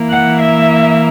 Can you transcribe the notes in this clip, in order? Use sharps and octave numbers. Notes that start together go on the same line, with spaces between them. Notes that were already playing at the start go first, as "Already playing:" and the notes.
Already playing: E3 A#3 E4
F#5
E5